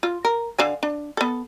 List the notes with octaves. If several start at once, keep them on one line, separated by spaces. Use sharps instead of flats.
F4
A#4
D3 F5 G#5
D4
B3 A4